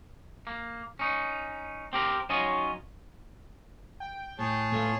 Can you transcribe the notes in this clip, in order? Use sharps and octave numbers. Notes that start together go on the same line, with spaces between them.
A#3
C#4 D#4
C4 G4 A#4
F#3 C#4 D#4 F4 C#5 D#5
G5
A2 G#4 C#5 A5
A2 A3 B3 F4